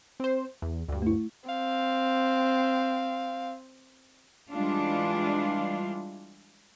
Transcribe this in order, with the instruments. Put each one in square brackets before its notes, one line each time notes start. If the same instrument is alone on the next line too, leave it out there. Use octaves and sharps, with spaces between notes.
[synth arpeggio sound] C4 C5
E2
D2 G2
[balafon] A3 E4
[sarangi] C4 [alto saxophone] F5
[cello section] E3 G3 G#3 D4 F4